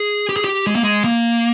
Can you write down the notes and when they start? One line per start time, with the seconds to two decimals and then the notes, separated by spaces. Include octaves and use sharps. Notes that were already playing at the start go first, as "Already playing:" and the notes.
Already playing: G#4
0.29 G4
0.36 G#4
0.44 G4
0.67 G#3
0.75 A#3
0.84 G#3
1.04 A#3